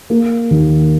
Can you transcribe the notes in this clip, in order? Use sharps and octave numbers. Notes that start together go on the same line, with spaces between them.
A#3
D#2